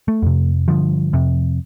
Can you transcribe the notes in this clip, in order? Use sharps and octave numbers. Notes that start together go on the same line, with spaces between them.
A3
F2 C3
G2 D3 F3
F2 C3